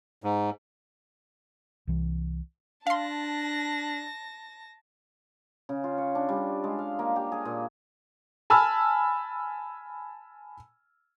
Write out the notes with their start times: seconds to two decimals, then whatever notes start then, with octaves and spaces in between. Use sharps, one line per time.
0.24 G#2
1.87 C2 E3
2.87 D4 F5 A5 C6 A#6
5.69 C#3
5.84 F4
5.98 C#5
6.15 D4
6.29 G3
6.64 G#3
6.79 F5
6.99 A#3
7.16 G4
7.32 G#4
7.45 A#2
8.50 G#5 A5 B5 E6 F6